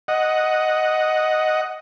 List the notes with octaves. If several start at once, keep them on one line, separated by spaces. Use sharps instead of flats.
D#5 F#5